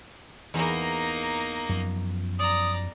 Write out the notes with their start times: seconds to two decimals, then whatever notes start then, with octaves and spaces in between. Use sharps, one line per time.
0.54 E2 A#3 D#4
1.69 F#2 F3
2.39 D5 A#5 D#6